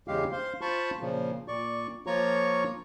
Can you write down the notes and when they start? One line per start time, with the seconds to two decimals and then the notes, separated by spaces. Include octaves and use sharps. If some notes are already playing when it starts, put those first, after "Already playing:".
0.08 E2 C#3 G#3 G4 F5
0.32 C5 F5 C6
0.61 F4 C5 A5 B5 C#6
1.01 A#2 C#3 F3
1.48 A#2 D5 C#6
2.06 F3 A#3 F4 C#5 A#5 C#6